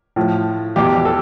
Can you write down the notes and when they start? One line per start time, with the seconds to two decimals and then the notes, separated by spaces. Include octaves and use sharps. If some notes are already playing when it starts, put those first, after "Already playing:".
0.16 A2 F3
0.76 E2 B2 G4
1.05 A4